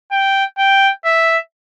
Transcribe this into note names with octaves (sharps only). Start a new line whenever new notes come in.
G5
G5
E5